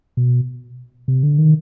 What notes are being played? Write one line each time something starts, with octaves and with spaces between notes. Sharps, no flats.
B2
C3
D3
D#3